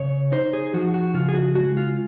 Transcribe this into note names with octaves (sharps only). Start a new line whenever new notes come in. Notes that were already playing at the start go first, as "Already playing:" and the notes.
Already playing: C#3 C#5
D#4 C5
G#4
F3 F#4
F#4
C#3 F4
G#4
F#4
G#3 F#4
F4